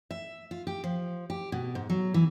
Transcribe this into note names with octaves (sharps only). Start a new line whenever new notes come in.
E5
F4
G4
F3
G4
B2
G#2
F#3
E3